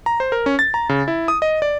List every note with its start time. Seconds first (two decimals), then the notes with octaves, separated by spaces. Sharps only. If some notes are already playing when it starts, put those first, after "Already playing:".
0.06 A#5
0.20 C5
0.32 A#4
0.46 C#4
0.59 A6
0.74 A#5
0.89 C#3
1.08 E4
1.28 D#6
1.42 D#5
1.62 D5